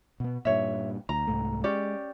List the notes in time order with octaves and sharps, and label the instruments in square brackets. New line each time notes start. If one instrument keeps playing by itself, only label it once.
[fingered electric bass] B2 B3
[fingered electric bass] G2 A#2 [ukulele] C#5 E5
[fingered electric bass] D2 [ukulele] A#5
[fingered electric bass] C2 G#2 A3
[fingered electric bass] G#3 [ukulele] C#4 G4 D5